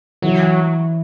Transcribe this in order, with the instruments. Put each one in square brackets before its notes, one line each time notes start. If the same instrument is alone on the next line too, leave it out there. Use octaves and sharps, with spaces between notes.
[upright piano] E3 [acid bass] F#3